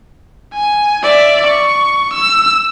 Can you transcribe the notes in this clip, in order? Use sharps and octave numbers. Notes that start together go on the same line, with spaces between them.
G#5
D5 E5
C#6
E6